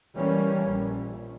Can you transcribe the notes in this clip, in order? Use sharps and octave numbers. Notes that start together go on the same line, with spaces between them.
E3 G3 A#3 C#4
A#1